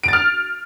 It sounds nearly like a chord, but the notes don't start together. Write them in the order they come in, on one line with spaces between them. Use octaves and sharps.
D7 A6 F6